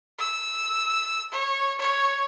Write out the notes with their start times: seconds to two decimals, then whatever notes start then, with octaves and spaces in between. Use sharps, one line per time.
0.18 E6
1.32 C#5
1.78 C#5